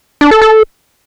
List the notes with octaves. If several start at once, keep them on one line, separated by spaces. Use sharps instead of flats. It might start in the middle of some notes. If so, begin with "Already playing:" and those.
D4
A4
A4